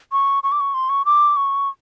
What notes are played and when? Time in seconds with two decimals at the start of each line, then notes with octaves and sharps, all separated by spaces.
0.12 C#6
0.43 C#6
0.52 D6
0.60 C#6
0.74 C6
0.89 C#6
1.05 D6
1.36 C#6